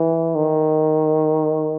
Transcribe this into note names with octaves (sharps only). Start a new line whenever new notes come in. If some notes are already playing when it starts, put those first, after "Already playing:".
Already playing: E3
D#3